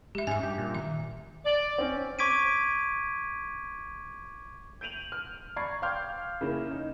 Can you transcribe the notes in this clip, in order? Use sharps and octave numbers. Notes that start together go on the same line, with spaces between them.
G#3 G4 E5
G#2 C#4 E5 G#5
G2 G4
A#2
D#3 E5
D5
C4 C#4
C#6 D6 G#6 B6 D7 D#7
G6 D7 D#7 F7 F#7
F6
D5 A#5 B5 C#6 G#6 C7
F5 G5 C6 D6 F6 G6
C#3 A#3 C#4 E4 A#4
D#4